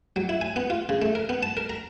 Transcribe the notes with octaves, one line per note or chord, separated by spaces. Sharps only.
F#3
E4
G#5
B3
F4
C#3
A3
A#4
B3
A5
A#4
A#5